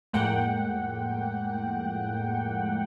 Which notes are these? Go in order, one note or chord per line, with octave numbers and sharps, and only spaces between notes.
F2 A2 G#3 A#3 F#5 G5